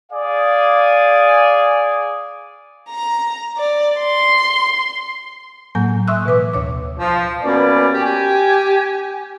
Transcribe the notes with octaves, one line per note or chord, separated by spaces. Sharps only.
G#4 D5 F5 G#5
A#5
D5
C6
A2 F#3 A#3 G#5 G6
E5 C6 C#6 D#6 E6 F#6
B2 E3 B4 D6
D2 C#5 D6
F3
B2 A#3 C#4 B4 D5
G4 G#5